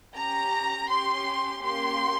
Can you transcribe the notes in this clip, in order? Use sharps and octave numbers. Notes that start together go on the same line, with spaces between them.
C#4 G4 A#5
C#4 G4 C6
A#3 C#4 G4 C6